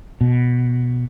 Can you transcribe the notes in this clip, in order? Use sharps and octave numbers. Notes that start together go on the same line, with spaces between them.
B2